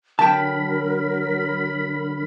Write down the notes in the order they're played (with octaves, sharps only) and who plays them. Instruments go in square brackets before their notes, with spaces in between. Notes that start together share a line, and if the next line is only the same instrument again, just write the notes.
[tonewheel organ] D3 B5 [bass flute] F#3 [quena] A#4 [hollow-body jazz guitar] G5 A5